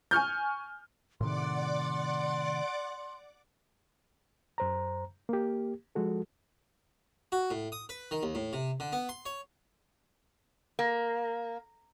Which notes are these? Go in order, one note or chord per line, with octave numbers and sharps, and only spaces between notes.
G#5 C#6 F6 G6
A2 C3 D#3 D5 F#5 C6 D6
F#2 C5 A#5
A#3 G4
F3 G#3 F#4 A4
F#4
A2
D#6
B4
D#3
D#2
A2
C3
D3
B3
C6
C#5
A#3